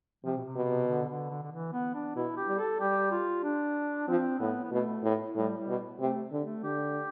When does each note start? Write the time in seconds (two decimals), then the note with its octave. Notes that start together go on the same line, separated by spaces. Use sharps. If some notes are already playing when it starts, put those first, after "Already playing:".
0.24 C3 F3
0.37 B2
0.45 C3
0.56 B2
0.66 C3
0.88 D3
1.09 D3
1.30 D3
1.43 D3
1.52 E3
1.73 B3
1.94 D4
2.16 B2 E4
2.37 G4
2.48 G3
2.58 A4
2.80 G3 G4
3.11 F4
3.44 D4
4.08 F3 C4
4.39 A2 B3
4.64 B3
4.71 B2 A3
5.03 A2
5.36 A2 G3
5.57 G3
5.68 B2
5.99 C3 A3
6.32 D3
6.42 A3
6.63 D3 G4